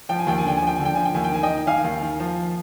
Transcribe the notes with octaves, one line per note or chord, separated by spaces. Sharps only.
F3 G5
G#5
D#2 G5
G#5
D3 G5
G#5
F3 G5
D3 G#5
G5
F3 G#5
G5
D#2 G#5
G5
D#3 G#5
D#5 G5
D#3
D#3 F5 G#5
D#2
D#3
F3